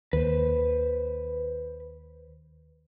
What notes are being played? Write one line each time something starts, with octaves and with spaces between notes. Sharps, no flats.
D#2 B4 C5